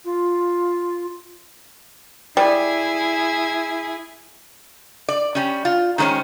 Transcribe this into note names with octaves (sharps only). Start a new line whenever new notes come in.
F4
G3 E4 G#4
D5
G3 C#4
F4
D#3 G#3 A#3 C#4 C5